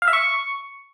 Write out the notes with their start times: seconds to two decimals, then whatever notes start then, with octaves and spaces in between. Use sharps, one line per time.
0.02 F5
0.08 E5
0.13 C#6